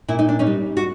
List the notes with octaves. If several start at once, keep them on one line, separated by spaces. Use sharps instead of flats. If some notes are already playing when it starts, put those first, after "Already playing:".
A#2 E4
D#4
D4
C#4 D#4
G3
F#4